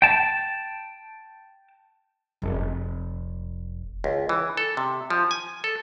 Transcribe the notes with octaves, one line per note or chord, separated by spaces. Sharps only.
G5 A5
F1
C#2
E3
A4
C3
F3
G#5
A4